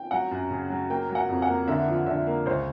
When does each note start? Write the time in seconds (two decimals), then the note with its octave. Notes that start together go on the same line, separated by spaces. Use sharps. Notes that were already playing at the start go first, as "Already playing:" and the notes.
Already playing: G5
0.11 F#3 F#5
0.31 F#2
0.51 C#3
0.70 F#3
0.90 A#3 G5
1.09 F#3
1.15 F#5
1.29 F2
1.42 F#5
1.48 A#3
1.68 D3 E5
1.87 F3
2.06 D3 E5
2.27 A#3
2.46 C#2 C5